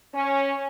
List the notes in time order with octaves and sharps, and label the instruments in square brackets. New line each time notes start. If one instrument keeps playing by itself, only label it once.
[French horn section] C#4